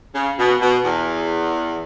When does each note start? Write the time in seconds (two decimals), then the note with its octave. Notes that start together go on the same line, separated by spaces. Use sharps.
0.14 C#3
0.38 B2
0.61 B2
0.84 E2